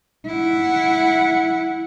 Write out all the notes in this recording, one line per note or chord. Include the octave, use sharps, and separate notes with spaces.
E4 F#5